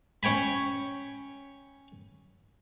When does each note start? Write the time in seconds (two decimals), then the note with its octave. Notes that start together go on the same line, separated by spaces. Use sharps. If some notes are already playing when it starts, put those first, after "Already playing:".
0.23 C#4 C#5 G5 G#5 B5